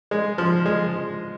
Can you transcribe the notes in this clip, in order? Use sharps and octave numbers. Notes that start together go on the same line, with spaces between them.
G#3
F3
G#3